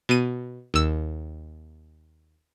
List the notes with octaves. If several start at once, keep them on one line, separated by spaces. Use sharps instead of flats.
B2 D#7
D#2 E6